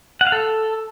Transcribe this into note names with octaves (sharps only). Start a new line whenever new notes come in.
F#5
F5
A4